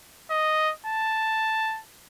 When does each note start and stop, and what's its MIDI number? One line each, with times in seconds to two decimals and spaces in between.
0.31 0.72 75
0.86 1.81 81